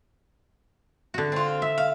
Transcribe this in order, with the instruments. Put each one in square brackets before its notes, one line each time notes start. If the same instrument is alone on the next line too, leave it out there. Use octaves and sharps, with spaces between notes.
[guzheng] D3 F#4
[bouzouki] C4 F4
[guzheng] E5
[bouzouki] F5